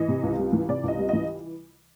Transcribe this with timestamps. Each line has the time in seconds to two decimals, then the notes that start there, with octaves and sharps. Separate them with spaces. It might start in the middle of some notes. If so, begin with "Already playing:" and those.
Already playing: E3 D#5
0.08 C3
0.23 C#2
0.38 G3
0.53 E3
0.68 C3 D5
0.83 C#2 D#5
0.99 G3
1.09 E3 D#5